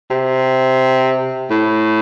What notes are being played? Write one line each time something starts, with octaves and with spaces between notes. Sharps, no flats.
C3
A2